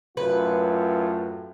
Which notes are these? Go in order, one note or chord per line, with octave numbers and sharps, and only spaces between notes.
F#2 A2 F4 B4